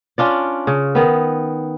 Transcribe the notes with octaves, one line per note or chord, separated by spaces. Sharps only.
C#4 D4 F4 D5
C#3
D#3 B3